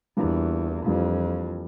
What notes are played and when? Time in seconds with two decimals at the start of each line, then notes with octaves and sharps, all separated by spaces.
0.17 E2 E3 G3 A#3 D4 F4
0.85 F2 E3 G3 A#3 D4 F4